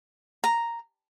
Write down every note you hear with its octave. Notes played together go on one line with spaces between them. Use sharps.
A#5